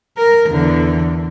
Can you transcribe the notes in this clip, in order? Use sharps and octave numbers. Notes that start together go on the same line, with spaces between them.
A#4
E2 D3